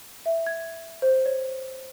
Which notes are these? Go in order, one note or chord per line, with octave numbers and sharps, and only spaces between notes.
E5
G#6
C5
C#5